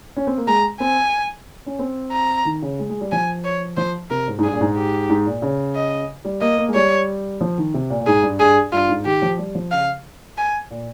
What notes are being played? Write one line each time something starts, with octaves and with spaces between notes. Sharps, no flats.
C#4
C4
A#3
G#3 A#5
C4 G#5
C#4
C4
A#5
D#3
C#3
G#3
G#3
G3
F3 G#5
C#5
F3 C5
C3 A#4
G#2
G#2
G2 G#4
A#2
G#2
G4
G#2
A#2
C#3
D#5
G3
A#3 D#5
A#3
G#3
G3 C#5
F3
D#3
C3
A#2
A#2
G#2 G#4
G2
G2 G#4
G2 F4
G#2
D#3 G4
F3
G3
F3
C#3 F5
G#5
A#2